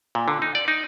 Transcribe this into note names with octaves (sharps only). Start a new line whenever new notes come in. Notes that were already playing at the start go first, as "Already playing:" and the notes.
A#2
D3
D#4
D5
D#4